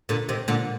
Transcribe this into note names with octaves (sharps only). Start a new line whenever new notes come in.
A#2 D3
C3 D#3
A#2 D3